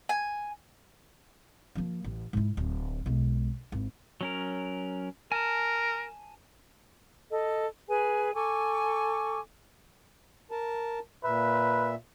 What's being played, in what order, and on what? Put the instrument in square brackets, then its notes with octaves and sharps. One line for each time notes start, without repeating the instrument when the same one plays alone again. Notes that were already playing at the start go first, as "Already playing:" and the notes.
[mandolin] G#5
[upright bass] F3 A#3
A1
G#2 E4
D1
B1 G#3
G#1 E4
[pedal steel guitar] F#3 C#4 A#4
[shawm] A#4 [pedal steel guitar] G#5 A5
[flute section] A4 D#5
G#4 B4 G#5
A4 G#5 C#6 D6
[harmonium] A#4 A5
[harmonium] A#2 E5 [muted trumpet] B4